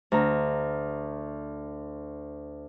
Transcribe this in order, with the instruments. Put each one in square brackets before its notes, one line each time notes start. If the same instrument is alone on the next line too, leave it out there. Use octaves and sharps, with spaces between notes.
[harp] D2 A#5